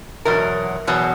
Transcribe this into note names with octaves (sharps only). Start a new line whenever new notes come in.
E2 B2 F#3 A#4
E2 B2 F#3